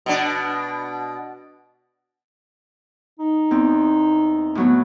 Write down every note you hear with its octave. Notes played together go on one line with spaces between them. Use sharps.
B2 D4
D#4
E2 C4
A2 F#3 B3